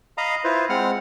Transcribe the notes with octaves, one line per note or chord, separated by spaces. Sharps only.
D#5 F5 A#5 B5 D#6
E4 F4 B4 C5
G#3 C4 F#5 F6